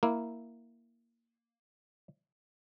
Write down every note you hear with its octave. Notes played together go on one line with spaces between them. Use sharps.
A#3 E4